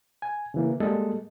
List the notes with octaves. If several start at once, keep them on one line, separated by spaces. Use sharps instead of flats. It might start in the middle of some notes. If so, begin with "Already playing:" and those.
G#5
C#3 E3 A#3
G3 G#3 A#3 A4 D#5